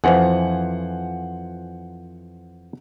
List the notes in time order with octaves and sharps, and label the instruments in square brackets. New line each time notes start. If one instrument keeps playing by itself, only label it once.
[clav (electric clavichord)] F2 E3 F3 [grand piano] C5 F#5 G#5